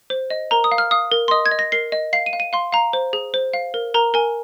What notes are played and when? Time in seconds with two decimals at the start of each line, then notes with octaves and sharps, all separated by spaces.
0.10 C5
0.30 D#5
0.51 A#4 A#5
0.64 D#6
0.72 F5
0.78 F6
0.91 F5 D#6
1.12 A#4
1.28 C6
1.31 D#5 D#6
1.46 G#6
1.51 D#5
1.59 A#6
1.72 A#4 C7
1.92 D#5
2.13 F5 C7
2.26 D#7
2.33 F5
2.40 D#7
2.53 F5 C6
2.73 F5 A#5
2.93 C5
3.13 G#4
3.34 C5
3.54 F5
3.74 A#4
3.94 A#4 A#5
4.14 A#4 G#5